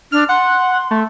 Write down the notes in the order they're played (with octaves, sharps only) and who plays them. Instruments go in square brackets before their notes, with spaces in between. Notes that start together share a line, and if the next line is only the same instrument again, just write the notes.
[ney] D4 [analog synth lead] F6
[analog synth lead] F#5 [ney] C6
[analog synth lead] A3